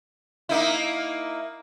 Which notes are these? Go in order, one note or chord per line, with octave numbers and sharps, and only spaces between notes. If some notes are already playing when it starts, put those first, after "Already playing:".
A#3 D#4 E4